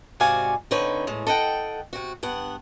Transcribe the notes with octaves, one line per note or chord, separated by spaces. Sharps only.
G#2 C3 F#4 D5 F5 G#5
D3 C4 D#4 B4 C#5
A2 G#3
A4 D#5 F#5 G5
C3 F#4
G2 B3 F#5